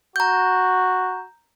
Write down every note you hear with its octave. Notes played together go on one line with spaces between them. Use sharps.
F#4 A#5 G6